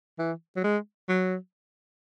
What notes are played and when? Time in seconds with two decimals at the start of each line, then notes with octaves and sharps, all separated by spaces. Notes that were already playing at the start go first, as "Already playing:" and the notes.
0.18 E3
0.56 F#3
0.64 G#3
1.09 F#3